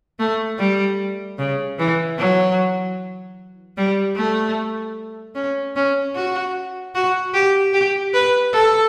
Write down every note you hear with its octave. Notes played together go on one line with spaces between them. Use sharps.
A3
G3
C#3
E3
F#3
G3
A3
C#4
C#4
F#4
F#4
G4
G4
B4
A4